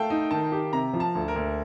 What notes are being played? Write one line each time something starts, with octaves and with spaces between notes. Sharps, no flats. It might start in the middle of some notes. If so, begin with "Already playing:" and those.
Already playing: A3 F5 G5 A5
D#4
D#3 A5
G4
C3 A#5
F3
A5
D2
A#4
D2